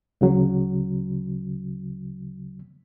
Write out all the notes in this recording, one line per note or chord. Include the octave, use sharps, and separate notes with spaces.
D2 C#3 F#3